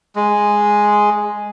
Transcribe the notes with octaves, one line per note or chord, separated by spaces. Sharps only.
G#3